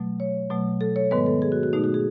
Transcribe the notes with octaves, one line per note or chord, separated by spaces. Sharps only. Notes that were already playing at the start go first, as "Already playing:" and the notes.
Already playing: B2 F#3 A3
C#5
B2 F#3 A3
A4
C#5
G#2 D#3 G#3 B3 B4
A4
G#4
F#4
F#4
B2 A3 D#4
F#4
G#4